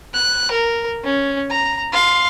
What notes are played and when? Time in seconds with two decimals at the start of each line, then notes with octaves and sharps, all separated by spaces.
0.14 F#6
0.51 A#4
1.04 C#4
1.50 A#5
1.92 F5 C6